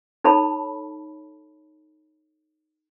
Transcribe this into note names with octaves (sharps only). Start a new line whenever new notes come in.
D#4 A4 C#5 A5 B5